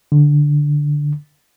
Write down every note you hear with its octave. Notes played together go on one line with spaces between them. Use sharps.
D3